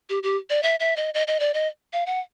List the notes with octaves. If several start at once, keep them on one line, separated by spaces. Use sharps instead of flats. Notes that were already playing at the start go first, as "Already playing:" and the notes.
G4
G4
D5
E5
E5
D#5
D#5
D#5
D5
D#5
F5
F#5